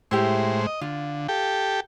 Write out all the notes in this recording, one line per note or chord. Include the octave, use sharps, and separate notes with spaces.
A2 G#3 E4 G4 C5
D#5
D3 F4
G4 A4 G5